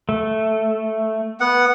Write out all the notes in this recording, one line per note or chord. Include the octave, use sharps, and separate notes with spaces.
A3
B3 F#5